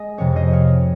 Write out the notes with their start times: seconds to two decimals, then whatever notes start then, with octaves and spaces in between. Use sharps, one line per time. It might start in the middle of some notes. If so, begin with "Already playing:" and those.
Already playing: G#3 D#5
0.18 F2 C3 F3 C4 C#5
0.36 C5 D#5
0.53 C#5 F5